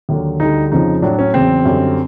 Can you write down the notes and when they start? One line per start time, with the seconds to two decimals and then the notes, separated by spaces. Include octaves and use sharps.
0.09 D#2 D3 F#3
0.40 D2 D3 G3 D#4
0.72 F2 C#3 F3 D#4
1.02 A2 F#3 D4
1.19 C#4
1.34 E2 C#3 F#3 C4
1.66 F#2 D3 G3